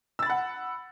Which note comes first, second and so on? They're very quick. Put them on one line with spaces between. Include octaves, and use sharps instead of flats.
E6 A6 B5 F#5